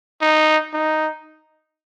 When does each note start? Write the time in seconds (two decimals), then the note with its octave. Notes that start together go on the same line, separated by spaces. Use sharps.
0.22 D#4
0.73 D#4